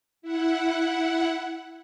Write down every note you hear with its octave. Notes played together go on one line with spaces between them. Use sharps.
E4 F#5